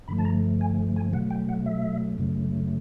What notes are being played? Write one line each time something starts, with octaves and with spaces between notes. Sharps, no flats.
G2 D3 F3 A3 B5
A5
A#5
G#5
G#5
B2 F#3 A3 F#5
G5
F#5
E5
F#2 C#3 F#3 A3